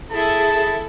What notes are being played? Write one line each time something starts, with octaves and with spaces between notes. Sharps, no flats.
E4 G#4 A4 A5